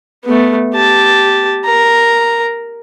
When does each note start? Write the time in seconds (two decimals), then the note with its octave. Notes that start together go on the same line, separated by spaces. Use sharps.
0.25 A3 B3
0.74 G4 A5
1.65 A#4 A#5